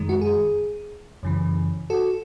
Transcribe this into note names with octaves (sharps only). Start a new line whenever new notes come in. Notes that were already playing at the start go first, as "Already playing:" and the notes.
Already playing: F#2 D#3 G#3
F#4
G#4
F#2 C#3 E3
F#4 A4